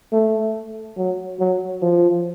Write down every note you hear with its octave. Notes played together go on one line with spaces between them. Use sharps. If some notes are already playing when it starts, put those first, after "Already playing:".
A3
F#3
F#3
F3